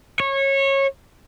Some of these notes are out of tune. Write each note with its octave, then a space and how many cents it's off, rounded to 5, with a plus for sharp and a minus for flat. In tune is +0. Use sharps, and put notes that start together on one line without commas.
C#5 -20